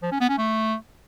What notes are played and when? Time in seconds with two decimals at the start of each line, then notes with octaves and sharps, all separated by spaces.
0.03 F3
0.11 C#4
0.20 B3
0.29 C#4
0.38 A3